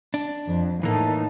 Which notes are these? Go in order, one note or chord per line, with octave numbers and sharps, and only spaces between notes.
D4
F2
A2 E3 A#3 D#4 A4